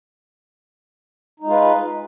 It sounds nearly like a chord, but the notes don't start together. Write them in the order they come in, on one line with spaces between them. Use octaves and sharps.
D#4 G#3 F4 B4